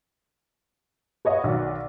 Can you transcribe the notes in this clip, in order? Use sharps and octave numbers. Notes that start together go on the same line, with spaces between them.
B4 C#5 D#5 F5 F#5
B1 D#3 F#4 D5